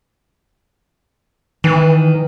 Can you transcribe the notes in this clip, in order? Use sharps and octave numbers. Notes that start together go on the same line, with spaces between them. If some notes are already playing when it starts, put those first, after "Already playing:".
D#3 E3